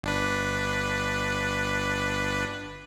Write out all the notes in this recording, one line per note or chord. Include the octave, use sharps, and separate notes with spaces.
G1 D4 B4